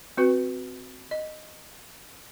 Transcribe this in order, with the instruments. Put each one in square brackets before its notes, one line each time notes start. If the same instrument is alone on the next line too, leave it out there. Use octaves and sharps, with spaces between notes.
[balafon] C4 F#4 B4
D#5